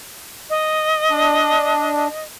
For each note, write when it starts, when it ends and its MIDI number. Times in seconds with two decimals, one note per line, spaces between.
0.50 2.25 75
1.10 2.08 62